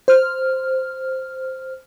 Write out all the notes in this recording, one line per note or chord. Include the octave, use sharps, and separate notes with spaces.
C5 F6